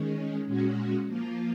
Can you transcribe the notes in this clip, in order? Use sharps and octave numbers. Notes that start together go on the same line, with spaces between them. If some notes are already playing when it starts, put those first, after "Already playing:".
Already playing: D#3 G#3 C#4
A#2 G#3 C#4 F#4
F3 A#3 F4